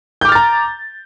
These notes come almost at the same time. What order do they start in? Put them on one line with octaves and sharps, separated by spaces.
G6 D6 F6 A6 A#5